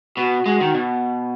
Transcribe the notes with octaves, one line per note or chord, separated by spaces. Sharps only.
B2 F#4
G#3 F#4
D#3
B2